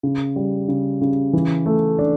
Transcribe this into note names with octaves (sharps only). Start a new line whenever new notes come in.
C#3
G3
C#3
C#3
E3
A3
D4